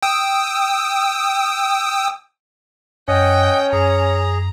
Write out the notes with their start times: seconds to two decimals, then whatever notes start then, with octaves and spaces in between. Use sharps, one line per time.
0.03 G5 D#6 E6
3.08 F#2 C#4 D#5 F#5 G5
3.73 F#2 G#4 A#5